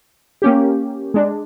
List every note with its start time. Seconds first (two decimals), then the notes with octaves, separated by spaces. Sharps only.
0.42 A#3 C#4 G4
1.14 G#3 D4